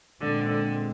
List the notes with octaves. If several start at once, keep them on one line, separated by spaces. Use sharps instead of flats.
A#2 D3 G#3 C4
D3